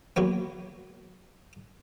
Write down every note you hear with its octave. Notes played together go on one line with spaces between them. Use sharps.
F#3 A#3 B3